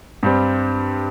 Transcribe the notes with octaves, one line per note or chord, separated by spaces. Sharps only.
G2 G3 C4